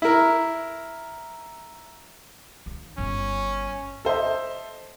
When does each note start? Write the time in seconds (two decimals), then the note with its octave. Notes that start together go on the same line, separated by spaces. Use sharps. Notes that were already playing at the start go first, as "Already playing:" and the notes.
0.02 E4 A#4
2.66 D#2
2.98 G1 C#4
4.05 A4 C5 D#5 E5